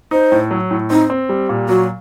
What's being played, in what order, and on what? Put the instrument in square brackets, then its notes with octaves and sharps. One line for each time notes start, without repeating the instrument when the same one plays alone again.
[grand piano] D#4 [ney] C5
[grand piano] A2
F#3
A2
[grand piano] C4 [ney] D#4
[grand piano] C4
G3
A#2
[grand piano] F#3 [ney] F#4